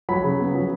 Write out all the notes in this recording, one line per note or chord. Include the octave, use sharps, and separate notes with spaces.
F#3 B5
C#3
B3
F#3